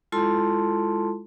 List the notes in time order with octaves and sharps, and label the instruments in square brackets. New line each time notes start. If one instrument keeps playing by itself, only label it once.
[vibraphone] G#3 E4 F4 A4 A5 C6